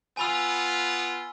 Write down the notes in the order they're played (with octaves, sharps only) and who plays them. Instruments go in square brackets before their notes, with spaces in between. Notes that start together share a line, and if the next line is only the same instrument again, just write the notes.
[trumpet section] B3 F4 [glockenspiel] G#5 B5 E6